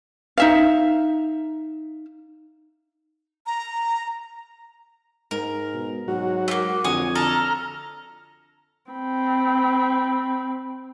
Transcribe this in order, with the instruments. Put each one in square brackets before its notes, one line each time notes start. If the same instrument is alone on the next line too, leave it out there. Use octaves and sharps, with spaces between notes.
[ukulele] D#4 E5 F5
[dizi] A#5
[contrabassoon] G#2 [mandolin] A#4
[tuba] B2
[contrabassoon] G#2 [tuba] F#3 [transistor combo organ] F#4
[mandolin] A3 A#3
[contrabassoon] F2 [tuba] D3 [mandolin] C#5 G#5 D#6
[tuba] D3 [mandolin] A4 [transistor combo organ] A#5 F6
[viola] C4 B5